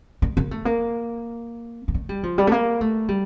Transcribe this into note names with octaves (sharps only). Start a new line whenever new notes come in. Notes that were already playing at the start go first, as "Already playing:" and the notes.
A3
A#3
A3
A#3
A#3
A3
G3
F3
G3
A3
A#3
A3
G3